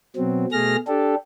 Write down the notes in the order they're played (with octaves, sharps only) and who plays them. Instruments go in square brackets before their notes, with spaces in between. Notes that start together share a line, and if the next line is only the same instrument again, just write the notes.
[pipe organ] B2 F#3 C4
B2 A3 G#4 F6 A#6
D4 G4 A4